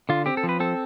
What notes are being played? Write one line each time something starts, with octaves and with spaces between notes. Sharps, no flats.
D3 F4
C4 G4
A4
F3
B4
C4 A4